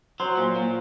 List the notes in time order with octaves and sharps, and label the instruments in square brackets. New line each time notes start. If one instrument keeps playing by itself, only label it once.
[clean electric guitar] F#3 [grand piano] C5 C6
[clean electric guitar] A#2
A#2